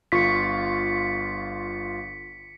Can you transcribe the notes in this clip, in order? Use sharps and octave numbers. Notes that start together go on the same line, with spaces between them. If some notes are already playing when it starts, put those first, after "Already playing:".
G1 F4 C#6 B6 C#7